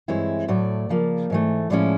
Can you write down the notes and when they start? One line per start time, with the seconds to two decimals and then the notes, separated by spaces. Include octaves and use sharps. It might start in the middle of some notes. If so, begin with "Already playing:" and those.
0.08 G2 E3 G#3 C4 E4 C#5
0.48 A2 F#3 A3 D5
0.89 C#3 F3 A#3
1.30 G#2 E3 A3
1.70 A2 F3 G#3 C#4 E4 D5